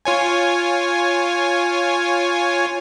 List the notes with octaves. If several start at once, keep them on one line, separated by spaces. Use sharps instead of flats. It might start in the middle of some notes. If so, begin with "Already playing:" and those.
F4 C#5 G#5